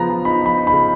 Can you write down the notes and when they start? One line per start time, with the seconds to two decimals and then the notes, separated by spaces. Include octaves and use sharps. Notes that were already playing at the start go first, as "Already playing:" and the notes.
Already playing: C#3 F3 B3 A#5
0.10 F3
0.25 D#4 B5
0.41 F3 B5
0.57 D#4
0.67 B5
0.72 C#3